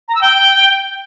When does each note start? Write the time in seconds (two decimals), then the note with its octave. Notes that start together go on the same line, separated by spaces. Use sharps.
0.08 A#5
0.15 E6
0.21 G5